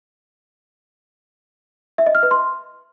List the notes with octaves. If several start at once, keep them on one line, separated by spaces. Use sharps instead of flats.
E5
D#5
F6
B4
C6